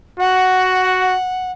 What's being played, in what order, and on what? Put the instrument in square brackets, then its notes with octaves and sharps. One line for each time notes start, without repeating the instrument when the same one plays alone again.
[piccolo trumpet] F#4 [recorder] F#5